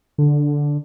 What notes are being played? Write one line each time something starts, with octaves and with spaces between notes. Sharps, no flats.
D3